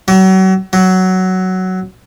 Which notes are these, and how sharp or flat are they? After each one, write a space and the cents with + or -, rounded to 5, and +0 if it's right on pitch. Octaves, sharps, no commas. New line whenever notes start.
F#3 +35
F#3 +10